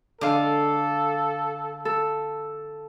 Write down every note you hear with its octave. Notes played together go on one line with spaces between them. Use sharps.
D3 G#3 A4 F5 D6
A4